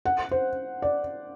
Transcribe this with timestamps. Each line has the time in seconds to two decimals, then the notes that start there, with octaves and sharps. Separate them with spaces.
0.05 F#5
0.31 C5
0.82 D5